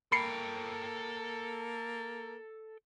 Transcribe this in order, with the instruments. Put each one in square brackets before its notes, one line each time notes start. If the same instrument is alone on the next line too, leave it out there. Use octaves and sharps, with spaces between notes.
[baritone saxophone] A#3 [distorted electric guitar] A4 G5 [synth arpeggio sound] B5 C7 C#7